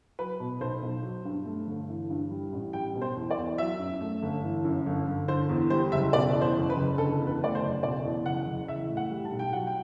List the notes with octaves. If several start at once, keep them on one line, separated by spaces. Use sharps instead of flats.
F#3 B4
B2
B1 C5
B1
F#3
G2
A3
G1
E3
G2
G3
A1
G3 G5
B2
C5
E2
D5
E2
F#3 E5
F#2
A3
G1
E3
F#2
G1
G1
D3 C5
E2
G3 C5
F#1 E5
B2 D5
E2
C5
F#1
B4
F#1
D3 A4
E2
B4
A3 D5
C5
F#1
B2 D5
E2
F#1 F#5
F#1
E3 E5
A2
F#5
G3
A5
B1
G5
F#3 F#5
G5